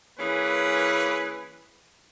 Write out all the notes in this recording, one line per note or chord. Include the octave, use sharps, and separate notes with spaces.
E3 A#3 C#4 G#4 B4